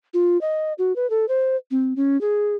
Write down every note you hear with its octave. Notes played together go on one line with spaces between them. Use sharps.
F4
D#5
F#4
B4
A4
C5
C4
C#4
G#4